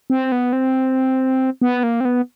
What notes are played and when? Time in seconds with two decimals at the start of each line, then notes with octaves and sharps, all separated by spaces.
0.10 C4
0.32 B3
0.53 C4
1.62 B3
1.83 A#3
2.00 C4
2.05 B3